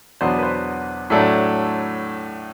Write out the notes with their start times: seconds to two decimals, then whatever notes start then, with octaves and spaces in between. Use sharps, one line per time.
0.21 E2 B2 F#3 B3 D4 C5
0.39 B4
0.43 C5
1.10 A2 F#3 A3 D4